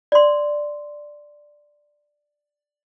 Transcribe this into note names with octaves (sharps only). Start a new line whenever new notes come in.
D5 C6